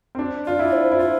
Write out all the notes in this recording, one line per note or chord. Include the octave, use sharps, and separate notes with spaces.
C4
D4
F4 D5
E4
C5
E4
F4 C5